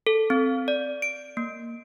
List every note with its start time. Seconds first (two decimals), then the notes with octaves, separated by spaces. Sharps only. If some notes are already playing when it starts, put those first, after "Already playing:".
0.07 A4
0.30 C4
0.68 D5
1.02 D7
1.37 A#3